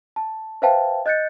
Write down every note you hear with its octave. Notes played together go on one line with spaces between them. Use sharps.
A5
B4 C5 E5 F5 G5 A5
D#5 F#6 G6 A6 C#7